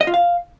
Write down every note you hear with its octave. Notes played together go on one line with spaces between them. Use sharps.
D#5
F4
F5